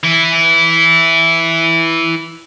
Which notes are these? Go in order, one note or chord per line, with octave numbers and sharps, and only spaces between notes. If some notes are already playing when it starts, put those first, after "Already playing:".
E3 E4